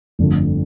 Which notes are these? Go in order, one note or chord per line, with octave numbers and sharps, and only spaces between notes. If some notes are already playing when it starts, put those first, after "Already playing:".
G1 F2 D3 A3